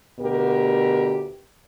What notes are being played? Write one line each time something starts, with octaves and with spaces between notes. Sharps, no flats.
D2 B2 G4 A#4